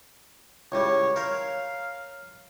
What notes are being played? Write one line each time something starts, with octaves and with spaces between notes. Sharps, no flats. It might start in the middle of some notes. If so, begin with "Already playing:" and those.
C#2 A2 G3 C#5
A#4 C5 C#5 F5